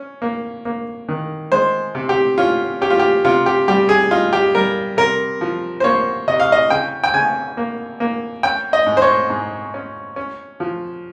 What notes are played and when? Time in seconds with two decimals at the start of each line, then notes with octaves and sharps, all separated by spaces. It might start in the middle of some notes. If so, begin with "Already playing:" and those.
Already playing: C#4
0.22 A#3
0.65 A#3
1.09 D#3
1.52 G#3 C5
1.95 C3
2.09 G4
2.38 C#4 F4
2.81 C#4 G4
2.90 F4
2.99 G4
3.25 C3 F4
3.46 G4
3.68 G3 G4
3.89 G#4
4.11 D#4 F4
4.33 G4
4.55 G3 A#4
4.97 C3 A#4
5.41 F3
5.80 C5
5.84 A#3 C#5
6.28 C3 D#5
6.40 F5
6.52 D#5
6.70 C#3 G5
7.04 G5
7.13 C#3 G#5
7.57 A#3
8.00 A#3
8.43 C#4 G5
8.73 D#5
8.86 G#2
8.97 C5
9.02 C#5
9.30 G#2
9.74 C#4
10.16 C#4
10.60 F3